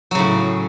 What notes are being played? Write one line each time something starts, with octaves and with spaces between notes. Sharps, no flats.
A2 C#3 F#3